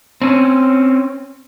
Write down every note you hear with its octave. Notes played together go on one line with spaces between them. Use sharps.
C4 C#4